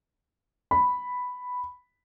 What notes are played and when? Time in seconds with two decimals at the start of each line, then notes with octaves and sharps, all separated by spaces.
0.71 B5